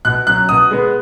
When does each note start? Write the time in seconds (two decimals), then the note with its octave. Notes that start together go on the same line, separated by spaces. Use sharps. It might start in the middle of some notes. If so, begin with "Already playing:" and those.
0.05 B2 F#6
0.27 F#3 C#4 F#6
0.49 B2 D#6
0.71 G#3 B3